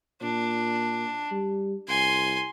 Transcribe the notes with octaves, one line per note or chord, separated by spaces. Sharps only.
A#2 D4
G3
C2 G#5 C6